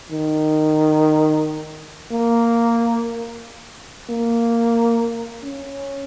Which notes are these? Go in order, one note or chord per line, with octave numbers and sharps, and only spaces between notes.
D#3
A#3
A#3
C#4